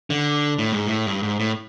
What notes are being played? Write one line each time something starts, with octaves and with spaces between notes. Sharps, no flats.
D3
A2
G#2
A2
G2
G#2
A2